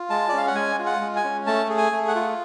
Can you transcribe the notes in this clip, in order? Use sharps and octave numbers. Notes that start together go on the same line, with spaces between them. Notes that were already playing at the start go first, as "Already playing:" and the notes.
Already playing: F4
G#3 A5
D5
C#4 F5
F#5
G#3 G#5
F4
F#5
G#3
G#5
C#4
A3 A5
G#4
G#5
A3
F#5
F4